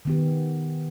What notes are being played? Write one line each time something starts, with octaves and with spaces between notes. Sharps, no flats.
D#3 B3 G4